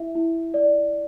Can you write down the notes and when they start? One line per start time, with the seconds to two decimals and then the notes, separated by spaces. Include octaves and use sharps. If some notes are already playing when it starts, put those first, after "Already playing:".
Already playing: E4 E5
0.15 E4
0.54 D5